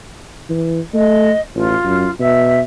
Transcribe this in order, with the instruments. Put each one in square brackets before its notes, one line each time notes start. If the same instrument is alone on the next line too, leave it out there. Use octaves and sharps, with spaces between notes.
[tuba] E3
[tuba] A3 [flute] D#5
[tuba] A1 [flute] F4
[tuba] F#2
[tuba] B2 [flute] E5